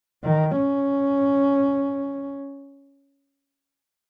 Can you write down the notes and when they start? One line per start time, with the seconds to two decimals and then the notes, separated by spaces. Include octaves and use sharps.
0.24 D#3
0.56 C#4